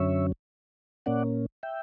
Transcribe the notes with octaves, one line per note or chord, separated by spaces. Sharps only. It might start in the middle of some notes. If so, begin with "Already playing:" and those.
Already playing: F#2 D3 F#3 C#4 C#5 E5
A#2 A#3 C#4 D5 F#5
E5 G5